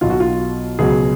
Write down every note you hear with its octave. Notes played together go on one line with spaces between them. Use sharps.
B1 B2 F#3 F4
F#4
F4
C#2 B2 F#3 G#4